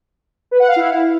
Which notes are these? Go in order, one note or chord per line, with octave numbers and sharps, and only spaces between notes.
B4
F#5
F5
E4